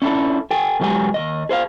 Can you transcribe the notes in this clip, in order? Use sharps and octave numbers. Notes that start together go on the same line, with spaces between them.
C#4 D4 E4 F#4 A4
A4 G5 G#5
B1 E2 F#3 G#3 G4 G#5
D#2 D#3 D#5
G#4 C5 E5 F5